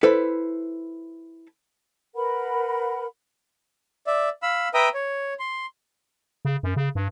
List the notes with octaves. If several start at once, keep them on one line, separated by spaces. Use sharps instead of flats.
E4 A4 B4 C5
A#4 B4 F#5 B5
D5 E5
F5 B5 E6
B4 E5 G5 A#5 D#6
C#5
C6
C#3
F#2
C#3
G2